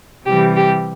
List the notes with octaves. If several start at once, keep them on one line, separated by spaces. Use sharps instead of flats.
C3 E3 G3 G4
G4